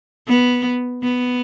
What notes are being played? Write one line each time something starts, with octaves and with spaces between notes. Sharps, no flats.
B3
B3